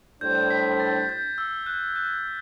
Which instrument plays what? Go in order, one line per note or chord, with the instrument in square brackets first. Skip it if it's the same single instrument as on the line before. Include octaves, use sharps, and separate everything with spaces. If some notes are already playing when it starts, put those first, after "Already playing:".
[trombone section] A2 G3 D4 A4 C5 [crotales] G6
[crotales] B6
A6
G6
E6
F#6
F#6